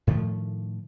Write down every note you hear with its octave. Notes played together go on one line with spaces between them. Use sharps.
A2 D#3 F3 A3